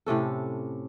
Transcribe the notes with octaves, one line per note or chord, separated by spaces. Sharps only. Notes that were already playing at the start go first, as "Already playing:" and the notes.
A2 C3 C#4 A4